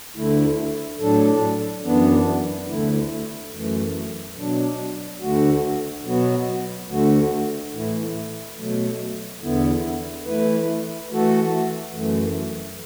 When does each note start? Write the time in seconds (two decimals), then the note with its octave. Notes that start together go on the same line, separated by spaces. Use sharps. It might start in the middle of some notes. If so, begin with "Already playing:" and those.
0.16 D2 D3 A3 E4
1.00 A2 F#3 D4 A4
1.84 F#2 E3 B3 D4
2.69 D2 D3 A3 E4
3.53 F#2 E3 A3
4.36 B2 F#3 D4
5.20 D2 D3 A3 F#4
6.05 B2 F#3 B3 F#4
6.89 D2 D3 A3 F#4
7.73 A2 E3 A3 E4
8.57 B2 F#3 A3
9.42 E2 D3 B3 E4
10.26 E3 A3 E4 B4
11.10 E3 A3 F#4 A4
11.94 F#2 E3 A3